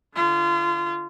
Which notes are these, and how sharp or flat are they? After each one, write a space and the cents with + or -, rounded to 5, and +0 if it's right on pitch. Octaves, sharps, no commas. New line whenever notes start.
D3 +0 F4 -30